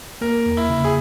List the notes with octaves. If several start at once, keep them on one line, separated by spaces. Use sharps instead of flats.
A#3 A#4
E2
E4
C#3
G#4